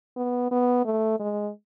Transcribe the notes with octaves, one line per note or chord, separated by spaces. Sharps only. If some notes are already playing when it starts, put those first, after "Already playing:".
B3
B3
A3
G#3